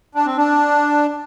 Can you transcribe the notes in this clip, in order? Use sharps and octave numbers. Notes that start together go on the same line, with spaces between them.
D4
C4
D4